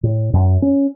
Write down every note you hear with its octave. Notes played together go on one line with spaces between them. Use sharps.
A2
F#2
C#4